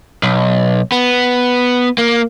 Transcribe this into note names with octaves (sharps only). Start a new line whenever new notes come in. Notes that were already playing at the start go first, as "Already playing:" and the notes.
B1
B3
A#3